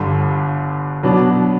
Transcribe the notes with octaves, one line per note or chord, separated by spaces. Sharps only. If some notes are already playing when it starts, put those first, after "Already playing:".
Already playing: G1 G2 D3
B2 F#3 B3 D4